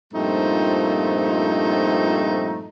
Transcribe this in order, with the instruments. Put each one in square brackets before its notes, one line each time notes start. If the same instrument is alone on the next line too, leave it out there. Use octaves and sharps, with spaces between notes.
[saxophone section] G2 A#2 F3 A3 C4 D#4